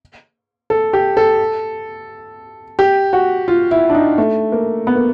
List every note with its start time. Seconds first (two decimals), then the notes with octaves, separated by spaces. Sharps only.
0.70 A4
0.93 G4
1.17 A4
2.79 G4
3.13 F#4
3.48 F4
3.71 E4
3.90 D4
3.95 D#4
4.18 A3
4.52 A#3
4.87 B3
4.96 A#3